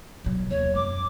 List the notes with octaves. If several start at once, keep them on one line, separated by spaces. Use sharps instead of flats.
B2 F#3
D#2 C#5
F#2 D6